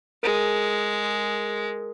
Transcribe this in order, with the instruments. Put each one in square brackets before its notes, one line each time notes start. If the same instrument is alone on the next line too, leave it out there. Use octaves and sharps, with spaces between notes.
[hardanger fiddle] G#3 [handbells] G#4 A#4